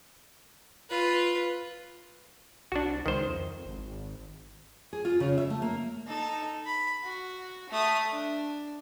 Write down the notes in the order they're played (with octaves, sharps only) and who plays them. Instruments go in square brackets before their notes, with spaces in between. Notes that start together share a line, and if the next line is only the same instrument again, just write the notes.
[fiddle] F4 B4
[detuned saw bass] C2 [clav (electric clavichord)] D4 F#4
[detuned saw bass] C#2 [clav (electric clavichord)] D#3 C5
[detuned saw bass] F2
G#1
[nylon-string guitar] G#4
F4
C#3
E5
A3
A#3
[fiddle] D#4 A4
B5
F#4
A3 D#6
D4